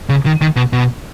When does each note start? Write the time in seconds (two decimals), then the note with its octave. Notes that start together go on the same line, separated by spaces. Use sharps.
0.09 C#3
0.26 D#3
0.41 D#3
0.56 B2
0.73 B2